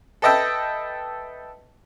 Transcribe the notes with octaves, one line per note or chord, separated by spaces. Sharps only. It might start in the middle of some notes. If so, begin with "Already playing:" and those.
A4 B4 D#5 E5 G5 A5